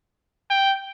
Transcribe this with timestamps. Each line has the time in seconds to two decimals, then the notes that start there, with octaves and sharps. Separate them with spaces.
0.51 G5